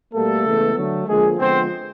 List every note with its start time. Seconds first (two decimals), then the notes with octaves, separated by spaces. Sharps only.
0.13 B2 G3 A3 A#3 A4
0.44 C#3 E3 G#3 B3
0.76 D3 F#3 A3
1.06 D3 F3 G#3 A#3 G#4
1.38 D3 F3 G#3 B3 C4 C5